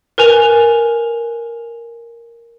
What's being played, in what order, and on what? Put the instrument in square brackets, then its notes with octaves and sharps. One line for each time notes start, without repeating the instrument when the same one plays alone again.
[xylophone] A#4 B4 G#5 F7